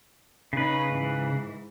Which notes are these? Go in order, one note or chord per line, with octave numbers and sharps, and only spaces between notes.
C#3 C#4 D#4 B4
G#2 E3